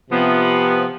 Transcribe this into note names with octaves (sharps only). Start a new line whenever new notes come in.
C3 F3 B3